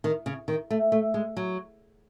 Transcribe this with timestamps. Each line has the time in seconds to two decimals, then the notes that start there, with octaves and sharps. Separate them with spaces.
0.04 D#3
0.26 C#3
0.48 D#3
0.70 A3
0.92 A3
1.14 G#3
1.37 F#3